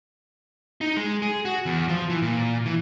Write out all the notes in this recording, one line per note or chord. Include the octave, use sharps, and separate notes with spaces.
D#4
G#3
G#4
F#4
E2
F3
E3
A#2
E3